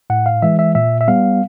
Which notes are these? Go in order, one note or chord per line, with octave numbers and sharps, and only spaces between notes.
A2 F#5
F5
E3 G#3 E5
E5
A#2 E5
E5
G3 B3 F5